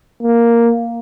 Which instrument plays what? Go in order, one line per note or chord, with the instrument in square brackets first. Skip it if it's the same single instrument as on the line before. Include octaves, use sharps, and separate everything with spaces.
[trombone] A#3